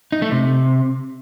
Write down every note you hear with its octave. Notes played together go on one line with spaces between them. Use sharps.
D#4
A3
C3